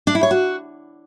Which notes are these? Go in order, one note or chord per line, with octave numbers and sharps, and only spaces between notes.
D4
E4
C#5
F#4